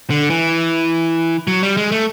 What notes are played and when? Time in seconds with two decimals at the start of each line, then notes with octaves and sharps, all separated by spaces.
0.10 D3
0.30 E3
1.47 F#3
1.63 G3
1.77 G#3
1.92 A3